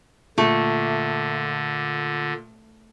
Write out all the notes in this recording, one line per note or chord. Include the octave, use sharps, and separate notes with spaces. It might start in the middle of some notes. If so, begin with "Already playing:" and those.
A#2 D3 A3